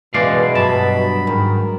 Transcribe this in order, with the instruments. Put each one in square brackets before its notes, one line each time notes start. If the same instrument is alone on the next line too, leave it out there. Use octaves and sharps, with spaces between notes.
[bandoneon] F#2 [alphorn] B2 [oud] E3 [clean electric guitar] G#3 D5 F5
[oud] G2 [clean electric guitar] F#3 A5 [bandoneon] B5
[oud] G#2 [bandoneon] D#3 [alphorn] A#4